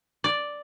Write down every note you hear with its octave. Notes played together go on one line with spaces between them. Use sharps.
D5